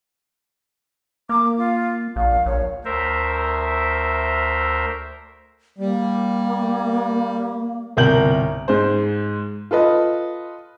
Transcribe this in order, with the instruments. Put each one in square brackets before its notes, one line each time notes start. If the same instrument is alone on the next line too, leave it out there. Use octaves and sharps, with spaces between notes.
[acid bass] A#3 [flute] D6
[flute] F4
[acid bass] A#1 [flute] F5
[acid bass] A#1 [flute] C#5
[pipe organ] D2 A#4 C5 E5
[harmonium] G3 [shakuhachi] A#3
[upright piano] G1 C2 A#4 G6 F#7
G#2 G#3 C5
F4 A4 B4 D#5